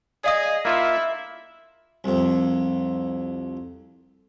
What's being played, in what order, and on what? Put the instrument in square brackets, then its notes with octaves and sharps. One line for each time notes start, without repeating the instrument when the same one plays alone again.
[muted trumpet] G#4 [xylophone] D5 F5 D#6 [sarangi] D#5
[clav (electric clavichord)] A#3 F4 [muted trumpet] E4 [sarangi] E5
[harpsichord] C2 F2